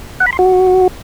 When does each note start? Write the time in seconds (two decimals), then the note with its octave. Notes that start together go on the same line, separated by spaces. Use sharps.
0.20 F#5
0.26 B5
0.33 C6
0.39 F#4